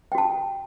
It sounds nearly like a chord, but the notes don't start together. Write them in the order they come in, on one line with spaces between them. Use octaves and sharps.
G5 F#4 A5